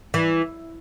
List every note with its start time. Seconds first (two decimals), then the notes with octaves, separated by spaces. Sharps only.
0.14 E3